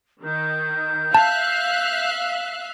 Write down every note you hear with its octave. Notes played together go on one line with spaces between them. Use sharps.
D#3 G6
E5 F5 A5 F#6